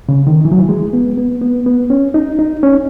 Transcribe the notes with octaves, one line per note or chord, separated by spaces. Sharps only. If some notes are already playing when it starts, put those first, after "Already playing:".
C#3
D#3
E3
F#3
E3
G#3
B3
B3
B3
B3
C#4
D#4
D#4
C#4